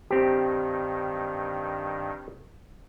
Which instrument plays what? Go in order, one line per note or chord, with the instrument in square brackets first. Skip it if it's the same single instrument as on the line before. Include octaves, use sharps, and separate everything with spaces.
[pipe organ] G2 D#3 [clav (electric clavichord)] C4 G4